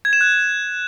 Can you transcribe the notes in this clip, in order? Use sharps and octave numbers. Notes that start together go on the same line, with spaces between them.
G#6
E7
F#6